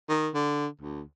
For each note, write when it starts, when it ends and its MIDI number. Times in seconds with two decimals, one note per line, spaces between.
0.09 0.29 51
0.34 0.67 50
0.81 1.02 38